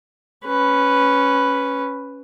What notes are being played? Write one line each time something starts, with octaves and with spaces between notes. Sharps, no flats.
C#4 B4